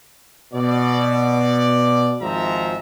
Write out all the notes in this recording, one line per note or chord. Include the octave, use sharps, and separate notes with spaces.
B2 D5
G#1 F3 G#3 C4 E5 A#5